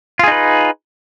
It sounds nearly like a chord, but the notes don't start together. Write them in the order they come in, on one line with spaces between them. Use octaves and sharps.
F4 G#4 D#4 B4